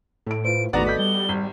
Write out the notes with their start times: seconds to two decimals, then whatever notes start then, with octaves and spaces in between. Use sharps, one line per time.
0.26 A2 A4 D7
0.44 F4 B4 C5 D7
0.73 G#1 E2 D#3 A3 B3 F#4 D5 A#5
0.86 A4 D#5 G6 B6
0.99 G3 G7
1.29 G#1